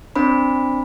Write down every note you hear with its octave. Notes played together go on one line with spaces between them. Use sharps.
C4 D4 C5 B5